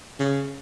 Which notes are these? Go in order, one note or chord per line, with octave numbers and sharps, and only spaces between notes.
C#3